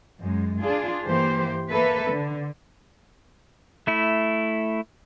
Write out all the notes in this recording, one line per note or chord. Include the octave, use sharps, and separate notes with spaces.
F#2 G#3
D4 F4 G#4
G2 E3 A#3 G4 C5
A#3 A4 B4 E5
D3
A3 E4